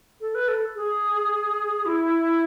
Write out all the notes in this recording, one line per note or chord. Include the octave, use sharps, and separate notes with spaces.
A4
B4
A4
G#4
E4